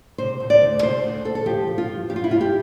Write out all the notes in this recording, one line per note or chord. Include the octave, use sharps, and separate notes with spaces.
C3 C5
D2
D5
D2
C3 C5
D2
D2 A4
A4
F3 G4
F3
F4
G2
G2 G4
F4
E4
G2 F4
G4